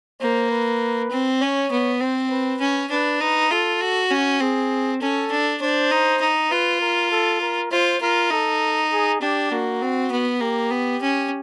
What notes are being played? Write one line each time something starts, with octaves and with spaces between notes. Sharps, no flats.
A#3 C5
B4
C4
C#4 C#5
B3
C4 C5
B4
C#4
D4 B4
D#4 B4
F4 A4
F#4
C#4 F#4
C4 G#4
C#4 A4
D4
D4 C5
D#4
D#4
F4 B4
A#4
A4
A#4
F4 C5
F4 A#4
D#4 A4
G#4
D4 G4
A#3 F#4
C4
B3
A#3 G4
B3
C#4